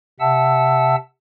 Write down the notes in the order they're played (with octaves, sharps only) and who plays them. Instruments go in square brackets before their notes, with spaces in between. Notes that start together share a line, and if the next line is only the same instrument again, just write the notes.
[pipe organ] C3 E5 F#5 A5 E6